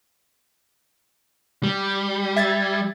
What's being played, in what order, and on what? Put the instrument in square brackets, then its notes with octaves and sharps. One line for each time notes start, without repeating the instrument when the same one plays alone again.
[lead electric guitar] G3
[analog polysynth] E5 G#6 A6